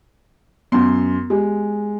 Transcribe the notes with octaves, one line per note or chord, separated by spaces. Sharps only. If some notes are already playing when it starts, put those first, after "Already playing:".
F#2 B3 C6
G#3 G4